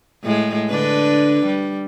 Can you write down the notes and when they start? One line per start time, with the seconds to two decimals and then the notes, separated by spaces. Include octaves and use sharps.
0.23 A2 G#3
0.69 D3 D4 B4
1.46 G3